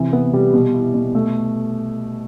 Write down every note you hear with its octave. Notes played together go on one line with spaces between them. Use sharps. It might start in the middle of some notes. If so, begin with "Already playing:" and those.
Already playing: C3 E3
B3
G3
B2
E4
B2
A3